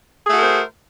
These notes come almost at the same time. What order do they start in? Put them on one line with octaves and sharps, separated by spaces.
G#4 A3 F#4 A#4 C5